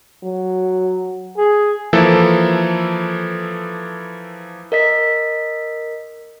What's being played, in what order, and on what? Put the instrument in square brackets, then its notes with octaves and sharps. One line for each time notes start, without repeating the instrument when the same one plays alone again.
[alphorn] F#3
[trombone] G#4
[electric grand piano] E3 F3 A#3 E4 A4
[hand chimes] A#4 D#5 B6